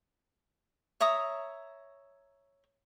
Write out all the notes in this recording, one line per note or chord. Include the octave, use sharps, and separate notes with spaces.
C#5 E5 A#5 D#6